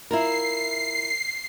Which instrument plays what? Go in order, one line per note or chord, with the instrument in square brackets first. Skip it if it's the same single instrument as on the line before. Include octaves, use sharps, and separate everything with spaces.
[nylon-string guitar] E4 F4 A#4 [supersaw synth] C7